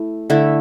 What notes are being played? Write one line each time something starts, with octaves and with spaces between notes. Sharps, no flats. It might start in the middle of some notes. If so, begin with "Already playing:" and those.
Already playing: A3 E4
D3 A3 E4